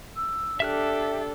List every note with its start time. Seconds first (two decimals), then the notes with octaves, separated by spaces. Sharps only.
0.15 E6
0.60 D4 G4 A4 E5 F6 F#6